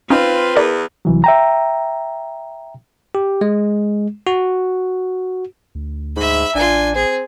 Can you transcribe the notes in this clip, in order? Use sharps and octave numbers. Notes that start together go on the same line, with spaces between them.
C4 C#4 D#4 F4 B4
E2 A#4 D5
C2 E3 F#3
E5 G5 A#5
G4
G#3
F#4
D2
G#2 E5 B5
A1 D4 F4 G#5
C4 G#4